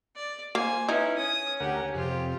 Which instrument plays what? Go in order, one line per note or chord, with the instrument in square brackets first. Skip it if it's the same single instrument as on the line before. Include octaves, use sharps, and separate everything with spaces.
[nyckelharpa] D5
[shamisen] A#3 [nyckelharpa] C5 G#5
[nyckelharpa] C#4 B4 [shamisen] D#4 [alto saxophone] E4
[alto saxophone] C#4 [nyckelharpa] D#6
[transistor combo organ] D2 A#4 F#5 [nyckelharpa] G4
[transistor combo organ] F2 C3 [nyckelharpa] F4 G4